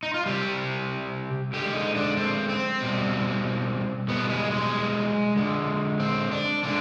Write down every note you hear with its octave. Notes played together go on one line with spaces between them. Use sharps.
D#4
F4
C3 G3 G4
D3 G#3 G4
D#4
D4
C4
C4
B2 G3
B2 G3 B3
G#3
G#3
D3 G#3
C4
D4
D3 G#3 D4